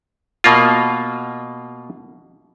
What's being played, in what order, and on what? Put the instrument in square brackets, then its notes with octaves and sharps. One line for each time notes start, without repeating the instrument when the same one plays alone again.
[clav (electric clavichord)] B2 A#3 F4